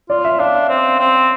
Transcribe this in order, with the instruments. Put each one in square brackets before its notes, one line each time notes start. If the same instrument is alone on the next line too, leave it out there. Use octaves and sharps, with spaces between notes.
[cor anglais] F4 [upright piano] D5
[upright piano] E5
[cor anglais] D4 [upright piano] F5
[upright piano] E5
[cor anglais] C4
C4